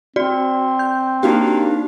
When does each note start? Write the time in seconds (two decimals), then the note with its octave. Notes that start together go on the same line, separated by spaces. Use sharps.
0.16 C4 F#4 D5
0.79 G6
1.23 A#3 D4 D#4 F#4 G4